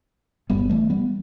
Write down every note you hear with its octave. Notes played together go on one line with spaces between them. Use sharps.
G1 G2 D3 G3 B3
E3 A3
G3 B3